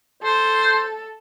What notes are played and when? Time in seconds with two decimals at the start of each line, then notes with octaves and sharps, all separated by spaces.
0.23 A4 C5